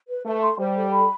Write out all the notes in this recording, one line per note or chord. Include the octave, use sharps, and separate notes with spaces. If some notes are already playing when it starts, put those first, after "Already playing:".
B4
A3 B4
C6
G3 C5
A4
B5